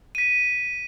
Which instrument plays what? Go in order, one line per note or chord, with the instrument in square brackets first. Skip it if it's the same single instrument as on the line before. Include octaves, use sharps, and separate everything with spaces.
[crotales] B6 D#7